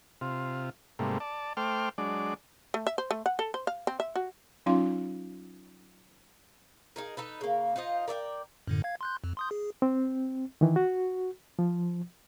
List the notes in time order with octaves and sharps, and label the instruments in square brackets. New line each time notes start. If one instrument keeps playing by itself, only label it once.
[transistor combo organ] C3 F4
G#2 C3 G3 A3 A#3
D5 A5
A3 C5 G5 D6 F6
F#3 G#3 D4 D5
[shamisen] A3
E5
C5
A3
F#5
A4
C5
F5
C4
E5
F#4
[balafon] F#3 C#4 D#4 F4 F5 C6
[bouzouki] D#4 G#4 A#4
D#4 A4 B4
C#3 A#3
D#4 F4 C5 D#5
A#4 D5 E5 G5
[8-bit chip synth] F#2 A2 D3
F5 G#6
C6 F#6 G6
F2
C6 D#6 G6
G#4
[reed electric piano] C4
D#3 E3
F#4
F3